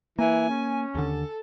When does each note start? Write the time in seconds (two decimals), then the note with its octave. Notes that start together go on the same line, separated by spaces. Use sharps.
0.19 E3 A#3 G#5
0.50 C#4
0.95 D#2 D3 A4